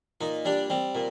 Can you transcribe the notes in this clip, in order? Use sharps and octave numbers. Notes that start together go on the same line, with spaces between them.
A#2 D#4
G3 D4
G3 C4
A#2